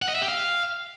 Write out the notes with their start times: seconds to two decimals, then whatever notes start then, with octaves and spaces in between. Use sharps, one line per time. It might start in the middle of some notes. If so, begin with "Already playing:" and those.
0.02 F#5
0.09 D#5
0.15 E5
0.22 G4
0.28 F5